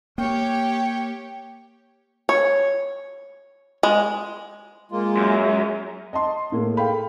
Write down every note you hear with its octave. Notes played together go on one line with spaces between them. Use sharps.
A#3 G4 C#5 G5
C#5
G#3
G#3 A#3 F4
F#2
G#3
D#5 A5 C6
A2 A#3 G#4
A4 F5 G5 B5